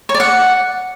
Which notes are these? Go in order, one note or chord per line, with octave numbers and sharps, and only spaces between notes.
C#5
D5
F#5